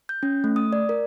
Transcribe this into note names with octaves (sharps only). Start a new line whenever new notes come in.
G6
C#4
A3
D#6
D5
A#4